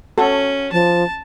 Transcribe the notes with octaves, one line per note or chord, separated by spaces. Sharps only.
C#4 F#4 A4
F3 A5